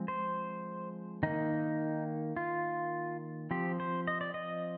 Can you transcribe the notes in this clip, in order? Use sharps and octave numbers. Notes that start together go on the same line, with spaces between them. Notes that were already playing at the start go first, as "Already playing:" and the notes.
Already playing: F3 G#3 C4
C5
D#3 A#3 D#4
F4
F3 C4 G4
C5
D#5
D5
D#5